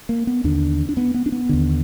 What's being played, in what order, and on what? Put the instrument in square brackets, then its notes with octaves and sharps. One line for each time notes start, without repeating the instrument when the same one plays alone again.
[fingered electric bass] A#3
B3
D#2 D3 D4
D4
B3
B3
D4
B3
D#2 D3